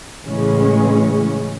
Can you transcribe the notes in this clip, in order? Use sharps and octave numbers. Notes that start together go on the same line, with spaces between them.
A1 C#3 E3 G#3 C#4